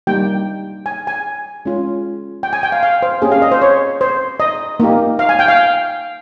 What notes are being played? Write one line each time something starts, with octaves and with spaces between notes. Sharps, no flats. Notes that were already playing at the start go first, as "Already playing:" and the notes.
G3 A#3 D#4 G4 G5
G#5
G#5
G#3 C#4 F4
G5
G#5
G5
F5
F5
C5
A#3 C#4 G4 G#4
F5
D#5
C5
C#5
C5
D#5
A#3 D#4 G4
F5
G#5
G5
F5